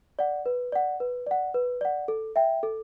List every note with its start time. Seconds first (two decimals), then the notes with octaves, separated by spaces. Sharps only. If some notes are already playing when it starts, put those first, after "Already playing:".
0.19 D5 F#5
0.46 B4
0.72 D5 F#5
1.00 B4
1.27 D5 F#5
1.54 B4
1.81 D5 F#5
2.08 A4
2.36 E5 G5
2.63 A4